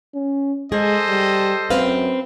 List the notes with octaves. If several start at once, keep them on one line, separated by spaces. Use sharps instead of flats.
C#4
G#3 G#4 A4 C5 D#5
G3
F#2 C4 B4 F5